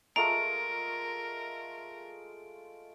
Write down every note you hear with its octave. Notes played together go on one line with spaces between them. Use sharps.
G#3 A3 F4 A#4 A#5 D7